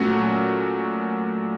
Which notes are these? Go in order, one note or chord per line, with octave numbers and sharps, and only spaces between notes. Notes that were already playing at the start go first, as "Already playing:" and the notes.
Already playing: A#2 F#3 A3 C#4 F#4